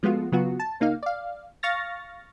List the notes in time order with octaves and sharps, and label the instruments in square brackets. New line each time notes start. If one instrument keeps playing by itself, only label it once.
[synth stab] F3 G#3 A3 B3 F4 F#4
C#3 F#3 B3 F4 F#4
A5
C#2 A#3 D#4 F5
D5 F5
F5 C#6 F6 A6 A#6